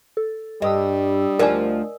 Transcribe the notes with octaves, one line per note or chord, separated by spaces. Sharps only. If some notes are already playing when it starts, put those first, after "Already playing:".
A4
G2 G3 D#5 D#6 E6
D2 F3 A#4 D5 G#5